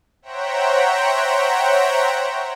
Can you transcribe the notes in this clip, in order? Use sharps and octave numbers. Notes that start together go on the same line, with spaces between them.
C5 C#5 E5 F#5 G5 A#5